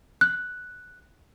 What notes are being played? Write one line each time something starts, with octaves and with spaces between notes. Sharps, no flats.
F#6